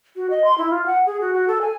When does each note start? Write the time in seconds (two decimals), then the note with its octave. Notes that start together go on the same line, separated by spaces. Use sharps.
0.16 F#4
0.30 D#5
0.44 C6
0.58 E4
0.70 F4
0.86 F#5
1.06 G#4
1.21 F#4
1.34 F#4
1.48 A4
1.61 G#5